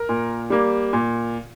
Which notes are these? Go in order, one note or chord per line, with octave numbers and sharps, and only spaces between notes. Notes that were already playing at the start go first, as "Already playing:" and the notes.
Already playing: A#4
A#2
G3 A#3
A#2